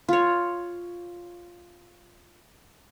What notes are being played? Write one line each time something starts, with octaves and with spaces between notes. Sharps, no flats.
F4 C#5